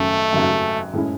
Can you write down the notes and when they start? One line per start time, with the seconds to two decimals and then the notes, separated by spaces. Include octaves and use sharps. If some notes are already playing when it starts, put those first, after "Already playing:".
Already playing: G#1 F#2 C#3 F#3 A3
0.32 G#1 F#2 C#3 F#3
0.93 A2 G#3 C#4 E4